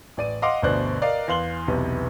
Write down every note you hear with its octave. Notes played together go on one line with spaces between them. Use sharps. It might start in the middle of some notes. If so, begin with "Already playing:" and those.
A1 D5 D#7
D#5 F5 F#5 C6 D6
G1 D2 B2 C5 D5 F#6
A#4 D5 D#5 F5
E2 F5 C6 F#7 G7
B1 E2 C3 B3